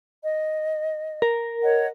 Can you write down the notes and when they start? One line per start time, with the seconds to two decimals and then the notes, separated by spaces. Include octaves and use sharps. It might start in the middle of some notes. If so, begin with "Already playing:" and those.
0.23 D#5
1.22 A#4
1.63 C#5 D#5 F#5